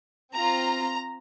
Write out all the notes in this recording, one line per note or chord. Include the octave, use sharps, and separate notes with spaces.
C4 F4 A#5